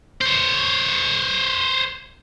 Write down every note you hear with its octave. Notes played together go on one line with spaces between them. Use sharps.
C5 C#5